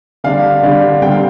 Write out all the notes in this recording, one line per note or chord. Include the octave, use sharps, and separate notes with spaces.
D3 G3 D4 F5
D3 G3 D4
D3 G3 C4 G5
F5